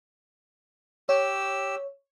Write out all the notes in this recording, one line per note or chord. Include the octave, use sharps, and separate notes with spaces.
G4 C#5 E6